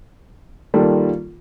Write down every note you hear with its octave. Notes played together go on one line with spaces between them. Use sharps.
D#3 G3 A#3 F4 A4